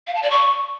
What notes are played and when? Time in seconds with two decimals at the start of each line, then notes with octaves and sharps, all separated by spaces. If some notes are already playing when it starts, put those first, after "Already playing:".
0.07 F5
0.15 A5
0.23 D5
0.30 C#6